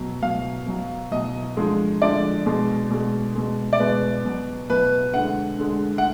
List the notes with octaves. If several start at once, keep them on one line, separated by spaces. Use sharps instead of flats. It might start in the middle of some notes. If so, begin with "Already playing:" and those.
Already playing: B2 F#3
B2 F#3 F5
B2 F#3
B2 F#3 D#5
D3 F3 G#3
D3 F3 G#3 D5
B2 G#3
B2 G#3
B2 G#3
D5
B2 G#3 B4
B2 F#3
B2 F#3 B4
D3 G#3 F#5
D3 G#3
F#5